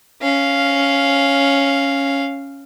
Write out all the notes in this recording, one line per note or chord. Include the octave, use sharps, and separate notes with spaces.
C#4 F5